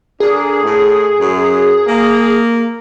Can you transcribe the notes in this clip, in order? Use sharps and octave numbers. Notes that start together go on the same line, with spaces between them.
D3 D4 G#4 A#4
A2
F#2
A#3